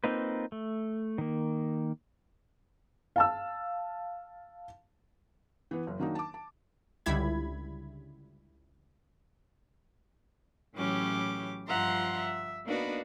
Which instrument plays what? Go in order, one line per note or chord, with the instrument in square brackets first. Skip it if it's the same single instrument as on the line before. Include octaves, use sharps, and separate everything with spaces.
[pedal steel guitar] A#3 C4 D#4 F4 B4
A3
D#3 A#3
[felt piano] F5 A5 E6
E3 B3
F#1
D#3 F#3 A#3 D4 D#4
A5 D6
A5
[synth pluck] C#2 D3 G3 E4 B5 G#6
[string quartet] A2 E3 F#3 C#4 G4 D6
G2 F3 E5 F#5 A#5 C6
E5
A#3 B3 D4 D#4 F#4 B4